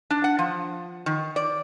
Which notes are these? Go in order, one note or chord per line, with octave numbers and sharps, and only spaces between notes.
D4
F#5
F3
D#3
D5